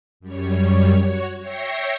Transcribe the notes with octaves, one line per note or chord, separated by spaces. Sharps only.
F#2 G3 C#5
F#4 C#5
C#5 E5 G5 A#6 C7 C#7